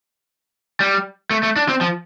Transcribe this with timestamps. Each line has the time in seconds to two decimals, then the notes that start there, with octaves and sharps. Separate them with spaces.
0.80 G3
1.31 A3
1.43 A3
1.56 D4
1.69 C4
1.81 F3